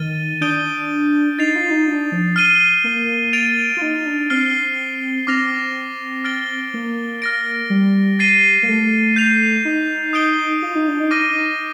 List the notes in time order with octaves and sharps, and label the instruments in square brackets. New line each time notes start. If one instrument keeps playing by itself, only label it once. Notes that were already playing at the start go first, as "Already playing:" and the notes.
Already playing: [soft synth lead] D#3 [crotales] F6 A6 D#7 G7
[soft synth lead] D4 [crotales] D#6 G6 D7 G7
[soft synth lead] D#4 [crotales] A6 C7 F7
[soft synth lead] F4
D#4
D4
F3
[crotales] F6 C7 D#7 G7
[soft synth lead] A#3
[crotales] A6 D7 F7
[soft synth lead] F4
D#4
D4
[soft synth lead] C4 [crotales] F6 C7 G7
[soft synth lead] C4 [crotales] D6 F6 A#6 F7
[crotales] F6 A6 D7 G7
[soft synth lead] A#3
[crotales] F6 A#6 D7
[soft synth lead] G3
[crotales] A6 C7 D#7 G7
[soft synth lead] A#3
A3
[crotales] G6 C7 F7
[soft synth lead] D#4
[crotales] D#6 G6 D7 G7
[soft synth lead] F4
D#4
D4
D#4
[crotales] D6 F6 A#6 D#7